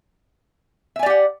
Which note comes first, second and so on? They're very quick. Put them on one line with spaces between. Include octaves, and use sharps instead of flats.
E5 G#5 D5 G4 F#5